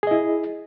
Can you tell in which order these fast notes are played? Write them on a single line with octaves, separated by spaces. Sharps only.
G#4 D#5 E4